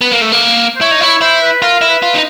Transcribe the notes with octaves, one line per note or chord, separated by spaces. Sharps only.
B3
A#3
A3
A#3
C5
E4 C#5
D#4
E4 C#5
E4 C5
B4
F4 A#4
E4
B4
F4
D#4